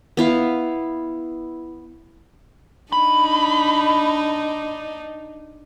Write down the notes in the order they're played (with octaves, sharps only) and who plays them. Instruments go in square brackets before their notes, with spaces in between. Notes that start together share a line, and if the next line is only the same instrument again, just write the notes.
[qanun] B3 E4 F5
[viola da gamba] D4 D#4 [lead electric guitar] B5